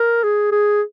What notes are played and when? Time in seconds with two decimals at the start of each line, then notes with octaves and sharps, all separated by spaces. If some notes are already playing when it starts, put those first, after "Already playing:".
Already playing: A#4
0.23 G#4
0.51 G#4